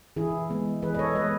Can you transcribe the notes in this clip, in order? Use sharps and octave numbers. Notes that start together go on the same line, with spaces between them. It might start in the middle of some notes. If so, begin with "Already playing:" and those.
E3 E4 G#4
G#3 B3
E3 G#4 B4
D#5
A4 C#5
G#3 B3 B4 D#5